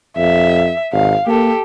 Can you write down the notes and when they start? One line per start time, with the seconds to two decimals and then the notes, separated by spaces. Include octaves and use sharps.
0.17 F2 E5
0.93 G#1 F5
1.27 A#3 G4 A4